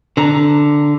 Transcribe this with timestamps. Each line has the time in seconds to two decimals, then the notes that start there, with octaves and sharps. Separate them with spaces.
0.17 D3 A#5